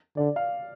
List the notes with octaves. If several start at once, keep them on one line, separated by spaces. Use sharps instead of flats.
D3 D5
F5